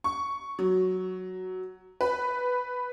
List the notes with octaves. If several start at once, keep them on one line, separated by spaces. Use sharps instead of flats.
C#6
F#3
B4